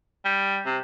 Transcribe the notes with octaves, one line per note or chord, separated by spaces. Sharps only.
G3
C3